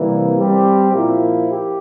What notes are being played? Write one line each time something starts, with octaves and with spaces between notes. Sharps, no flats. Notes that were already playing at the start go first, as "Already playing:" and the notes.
Already playing: C3 E3 G3 A#3
G3 C4 G4
A#2 F3 A#3 E4
G4